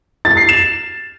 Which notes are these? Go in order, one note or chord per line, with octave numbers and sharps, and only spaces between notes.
A6
C7
E7